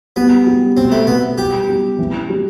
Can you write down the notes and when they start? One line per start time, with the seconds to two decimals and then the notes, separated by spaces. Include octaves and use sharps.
0.16 G3 B3
0.47 G3
0.77 B2 C4
0.92 A3
1.07 B2 B3
1.38 G3 G4
1.69 G3
1.99 E3
2.30 G3